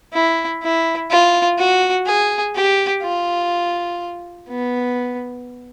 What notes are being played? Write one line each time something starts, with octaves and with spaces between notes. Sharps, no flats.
E4
E4
F4
F#4
G#4
G4
F4
B3